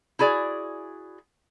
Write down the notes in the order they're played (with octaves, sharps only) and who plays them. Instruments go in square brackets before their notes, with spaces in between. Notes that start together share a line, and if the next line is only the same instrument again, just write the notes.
[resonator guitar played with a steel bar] E4 F#4 G#4 D5